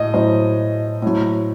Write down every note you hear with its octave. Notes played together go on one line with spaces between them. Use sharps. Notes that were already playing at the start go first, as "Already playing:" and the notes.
Already playing: A2 D#5
A2 F#3 C5
A2 F#3